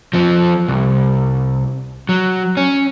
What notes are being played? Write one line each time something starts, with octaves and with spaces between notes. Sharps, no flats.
F3 C4
C2
F#3
C#4